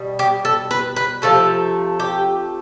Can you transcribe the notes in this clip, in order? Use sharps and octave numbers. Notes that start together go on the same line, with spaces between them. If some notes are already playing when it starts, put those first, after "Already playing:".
Already playing: B2 G3
G4
A4
B4
B4
C3 F3 A3 A4
G4